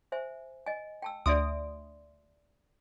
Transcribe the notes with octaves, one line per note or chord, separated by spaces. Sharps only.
C5 E5 G#5
D#5 G#5
G5 A5 E6
D2 D5 E5 C6 D#6 D7